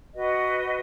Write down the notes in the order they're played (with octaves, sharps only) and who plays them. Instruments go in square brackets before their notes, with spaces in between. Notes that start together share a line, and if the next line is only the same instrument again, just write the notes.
[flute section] F#4 B4 D#5